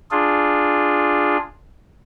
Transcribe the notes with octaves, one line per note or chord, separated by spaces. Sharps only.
D4 F4 G#4